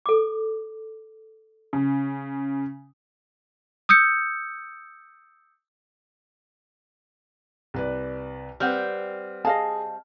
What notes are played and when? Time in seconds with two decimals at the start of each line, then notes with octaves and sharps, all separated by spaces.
0.06 A4 D6
1.73 C#3
3.89 D#6 E6 G6 C#7
7.74 C2 B4 D5
8.60 G3 C4 B4 F#5 F6
9.45 G#4 D#5 F5 A5